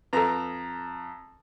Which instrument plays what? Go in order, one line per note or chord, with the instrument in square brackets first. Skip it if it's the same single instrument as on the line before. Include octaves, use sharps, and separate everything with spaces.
[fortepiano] F2 A#5 [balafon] A4 B4